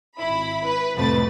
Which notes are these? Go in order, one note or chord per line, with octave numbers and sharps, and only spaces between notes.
G#1 E4 B5
B4
C2 F2 A2 A3 B4 A6